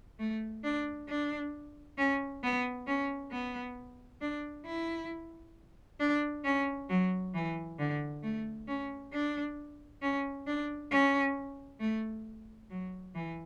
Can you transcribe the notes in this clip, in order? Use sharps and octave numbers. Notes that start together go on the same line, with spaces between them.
A3
D4
D4
C#4
B3
C#4
B3
D4
E4
D4
C#4
F#3
E3
D3
A3
C#4
D4
C#4
D4
C#4
A3
F#3
E3